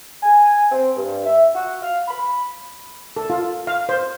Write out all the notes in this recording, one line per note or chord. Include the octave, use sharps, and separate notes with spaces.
G#5
C4
G2
E5
F#4
F5
B5
A4
F4
F5
C5